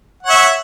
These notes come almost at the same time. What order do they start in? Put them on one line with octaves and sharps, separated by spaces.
F#5 C#5 E5